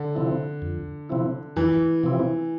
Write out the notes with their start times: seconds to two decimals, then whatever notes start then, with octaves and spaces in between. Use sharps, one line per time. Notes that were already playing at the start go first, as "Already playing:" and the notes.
Already playing: D3
0.15 C3 F3 C4 E4
0.62 F2
1.09 C3 F3 C4 E4
1.56 F2 E3
2.03 C3 F3 C4 E4